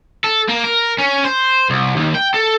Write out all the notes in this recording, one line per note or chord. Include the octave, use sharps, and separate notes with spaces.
A4
A#3
A#4
C#4
C5
C2
D#2
G5
A4